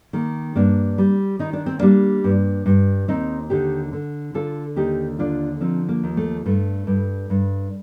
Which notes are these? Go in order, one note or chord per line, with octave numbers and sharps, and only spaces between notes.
D#3 A#3
G2 A#3 D4
G3
D#3 D#4
D4
C4
G3 A#3 D4
G2
G2
D#2 C4 D#4
D3 D#4 G4
D3
D3 F4 A4
D#2 D#4 G4
D3 D4 F4
F3 C4 D#4
A#3
D#2
A3
G2 A3
G2
G2